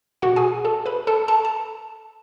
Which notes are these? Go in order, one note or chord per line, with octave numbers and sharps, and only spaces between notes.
B2 F#4 F#5
G#4 G#5
A4 A5
B4 B5
A4 A5
A4 A5
A5